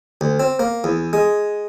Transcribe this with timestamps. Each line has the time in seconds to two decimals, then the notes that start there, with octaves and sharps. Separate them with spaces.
0.21 D2
0.40 C4
0.59 A#3
0.84 E2
1.13 G#3